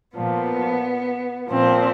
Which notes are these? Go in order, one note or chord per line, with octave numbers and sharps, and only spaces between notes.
A#2 F3 B3
A#2 F3 C4